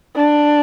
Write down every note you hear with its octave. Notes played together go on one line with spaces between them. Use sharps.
D4